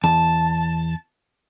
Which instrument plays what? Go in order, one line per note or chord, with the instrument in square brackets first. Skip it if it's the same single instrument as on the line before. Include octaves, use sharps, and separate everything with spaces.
[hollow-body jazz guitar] E2 [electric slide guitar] A5